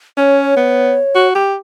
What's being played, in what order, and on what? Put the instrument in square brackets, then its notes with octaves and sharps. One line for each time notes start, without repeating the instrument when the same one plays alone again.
[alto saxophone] C#4 [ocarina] C#5
[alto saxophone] B3
F#4
G4